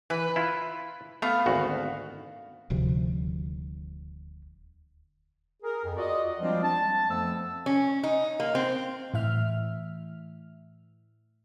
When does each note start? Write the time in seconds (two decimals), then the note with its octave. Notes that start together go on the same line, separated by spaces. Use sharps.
0.10 E3 B4
0.36 E4 F4
1.22 A3 B3 F5
1.46 G#1 D2 F#4
2.70 D#1 D2 C3 F3
5.63 G#4 A#4
5.84 F2
5.97 F4 F#4 D5 D#5
6.40 F3 G3 G#3 C4 D4 F4
6.63 A5
7.09 F2 F3 A3 B3 E6
7.66 C#4
8.03 D#4
8.40 A#3
8.55 C4
9.14 A2 E3 E5 F6